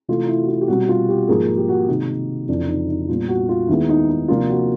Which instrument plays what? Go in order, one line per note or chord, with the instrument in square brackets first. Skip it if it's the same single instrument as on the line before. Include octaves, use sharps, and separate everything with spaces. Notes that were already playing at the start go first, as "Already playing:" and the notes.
[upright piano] C3 E3 A3 F4
E4
F#4
F4
G4
B2 G3 C4 F#4
F4
G4
G#2 F3 A#3 G#4
G4
F#4
C3 D#3 G#3 D#4
F2 C#3 E3 D4
D#4
D#4
A#2 G3 B3 D4 F4
F#4
F4
D#2 D#3 G#3 B3 E4
D#4
D#4
C3 F3 A#3 D4 F4
F#4